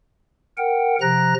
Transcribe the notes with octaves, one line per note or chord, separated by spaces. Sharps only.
A#4 F#5 G5
C3 F3 A#5 F#6 A#6